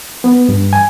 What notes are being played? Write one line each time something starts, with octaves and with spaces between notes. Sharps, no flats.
B3
G2
G#5